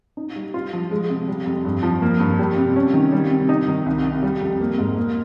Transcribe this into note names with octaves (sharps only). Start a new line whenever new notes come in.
D#4
G3
F4
F3
G#3
C3
G3
F2
G2
F3
A#3
G2
G3
C3
C#4
D#3
G3
C3
D#4
D#3
C2
C3
G3
F2
A#3
G#2
A#3